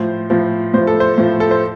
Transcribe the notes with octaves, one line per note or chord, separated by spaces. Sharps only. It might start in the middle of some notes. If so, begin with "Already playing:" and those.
Already playing: A2 F3 C5
A2 F3
A2 F3 C5
A4
C5
A2 F3
A4
C5